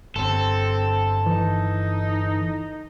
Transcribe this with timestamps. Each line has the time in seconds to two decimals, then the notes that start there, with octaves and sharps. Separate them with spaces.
0.16 G1 C4 A4
1.26 E3 D#4